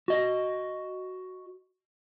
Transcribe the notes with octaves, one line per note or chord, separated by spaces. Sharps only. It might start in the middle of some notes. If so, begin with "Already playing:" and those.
F#4 D#5